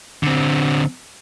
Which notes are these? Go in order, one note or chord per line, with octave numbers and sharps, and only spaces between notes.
D3 C4